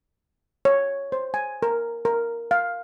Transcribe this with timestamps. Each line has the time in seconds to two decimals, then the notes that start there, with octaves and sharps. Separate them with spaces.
0.65 C#5
1.12 C5
1.34 G#5
1.63 A#4
2.05 A#4
2.51 F5